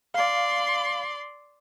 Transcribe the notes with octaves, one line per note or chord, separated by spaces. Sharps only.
D5 F5 C6